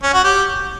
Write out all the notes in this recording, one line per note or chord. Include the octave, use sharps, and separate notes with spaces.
C#4
F#4
G4